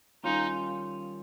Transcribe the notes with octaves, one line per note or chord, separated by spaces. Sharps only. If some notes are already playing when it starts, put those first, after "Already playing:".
D#2 D#3 G3 C#4 D#4 F4